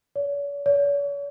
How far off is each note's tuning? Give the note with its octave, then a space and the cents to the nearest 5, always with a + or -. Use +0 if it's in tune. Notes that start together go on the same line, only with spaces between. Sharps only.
C#5 +40
C#5 +40